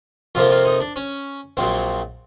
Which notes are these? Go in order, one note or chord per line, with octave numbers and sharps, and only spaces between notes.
F2 C3 F3 A#3 F4
F4
D#4
D4
C#4
A#1 A#2 F#3 C4